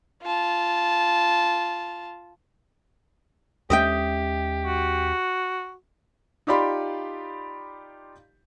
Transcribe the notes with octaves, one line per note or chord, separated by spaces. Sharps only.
F4 A5
D#2 G#3 C#4 G4 D#5 E5 G5
F#4
D#4 F4 G4 D5 B5 C6